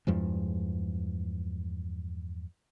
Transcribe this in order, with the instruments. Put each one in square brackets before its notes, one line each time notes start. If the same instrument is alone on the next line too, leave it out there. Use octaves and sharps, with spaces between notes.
[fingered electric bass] E2 G2 F3 G#3